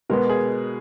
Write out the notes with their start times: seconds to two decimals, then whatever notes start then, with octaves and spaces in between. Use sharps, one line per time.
0.09 B2 G#3 B3 A#4
0.30 G#4